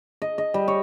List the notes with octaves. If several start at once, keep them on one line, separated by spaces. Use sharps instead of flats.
D#5
D#5
G3
C#5